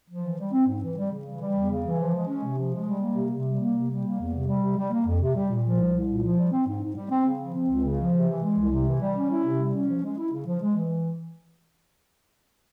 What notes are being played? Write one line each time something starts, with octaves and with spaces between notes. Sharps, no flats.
F3
E3
G3
C4
G#2
E3
G3
C#3
E3
G3
E2
C#3
E3
F3
G#3
C#4
C3
F3
G#3
G3
A#3
C3
C3
G3
A#3
C3
G3
A#3
E2
C3
G3
C3
G3
A#3
F2
C3
G3
A#2
F3
C2
C2
A#2
F3
G3
C4
G#2
G#2
G3
C4
C#3
F3
C4
C#2
C#3
F3
C3
E3
G#3
C2
C3
E3
G3
C#4
E4
C3
G3
C#4
F3
G#3
E4
C#3
F3
G#3
E3